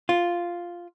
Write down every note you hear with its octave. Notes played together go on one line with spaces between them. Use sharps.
F4